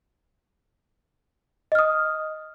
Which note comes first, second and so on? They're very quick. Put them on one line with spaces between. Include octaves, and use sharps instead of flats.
D#5 F6 D#6